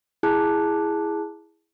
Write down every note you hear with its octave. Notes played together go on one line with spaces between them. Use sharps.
E4 G#4 A5 D6 F#6